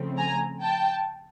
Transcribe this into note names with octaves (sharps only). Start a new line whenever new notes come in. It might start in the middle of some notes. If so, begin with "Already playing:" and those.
Already playing: C#3 F3 A3 C4
G#5 A#5
G5 A5